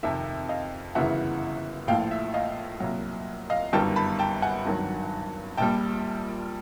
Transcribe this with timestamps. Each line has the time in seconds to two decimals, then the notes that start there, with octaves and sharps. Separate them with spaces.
0.03 F2 C3 D#3 E5
0.26 E5
0.49 D#5 F5
0.95 G1 F#2 C#3 E3 E5 F#5
1.88 A#1 A2 F3 F5 G5
2.11 E5
2.34 D#5 F5
2.80 C2 A#2 F#3
3.50 D#5 F5
3.73 G1 F#2 D#3 G3 G5 A5
3.96 A5 B5
4.19 G5 A5
4.42 F#5 G#5
4.65 G#1 G2 D#3 F#3
5.57 A#1 A#2 G3 G5 A5